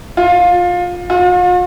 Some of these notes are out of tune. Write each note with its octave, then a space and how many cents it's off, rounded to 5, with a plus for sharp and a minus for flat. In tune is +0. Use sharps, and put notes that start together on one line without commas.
F4 +20
F4 +45